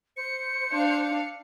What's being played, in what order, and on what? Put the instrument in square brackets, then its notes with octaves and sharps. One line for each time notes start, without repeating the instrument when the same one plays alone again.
[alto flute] C5 [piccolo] C#7
[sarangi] D4 [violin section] F5